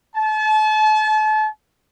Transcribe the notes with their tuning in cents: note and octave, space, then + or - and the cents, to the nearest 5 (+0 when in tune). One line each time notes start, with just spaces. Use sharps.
A5 -35